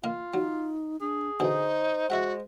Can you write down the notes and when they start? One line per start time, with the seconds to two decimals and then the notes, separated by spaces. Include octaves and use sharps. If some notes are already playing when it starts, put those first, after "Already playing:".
0.04 A#3 F4 D#5 F5
0.34 F#3 D#4
1.01 D4 G#4
1.40 B2 D3 E3 D#4 C5
2.10 G#3 E4 F#4 E5 F#5